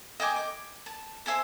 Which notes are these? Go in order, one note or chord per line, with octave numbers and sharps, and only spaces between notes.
D#5 G5 G#5 D6
D6
A5
C5 E5 G#5 A5